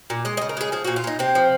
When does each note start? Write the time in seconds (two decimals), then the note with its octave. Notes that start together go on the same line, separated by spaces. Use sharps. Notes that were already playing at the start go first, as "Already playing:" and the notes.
0.10 A#2
0.25 G#3 D#5
0.37 C#3 D#5
0.49 A#4
0.57 G#3 G#4
0.72 F3 G#4
0.84 A#2 F#4
0.96 F4
1.04 A#2 D#4
1.19 C3 C4
1.35 F3